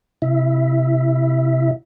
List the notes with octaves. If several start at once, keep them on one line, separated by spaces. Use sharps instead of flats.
C3 E4 E5